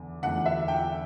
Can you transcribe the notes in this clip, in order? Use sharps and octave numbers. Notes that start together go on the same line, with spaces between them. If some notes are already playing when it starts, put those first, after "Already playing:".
Already playing: E2 D3
E2 D3 F#5
E5
G5